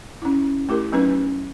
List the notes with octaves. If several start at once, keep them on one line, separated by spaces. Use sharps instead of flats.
C#4 E4
A3 E4 G4 A#4
F#3 B3 C#4 D#4 B4